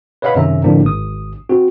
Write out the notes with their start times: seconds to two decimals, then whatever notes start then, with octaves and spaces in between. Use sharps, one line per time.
0.22 B4 C#5 D#5 F5 F#5 B5
0.35 F#2 C3 D#3 C#4 E5 A#5
0.64 A2 D3 F3 A#3 C4 D4
0.83 G#1 D#6
1.49 C4 F#4